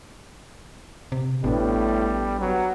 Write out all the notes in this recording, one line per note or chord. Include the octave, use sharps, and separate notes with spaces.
C3
A1 A2 G3 B3 D4
F#3 B3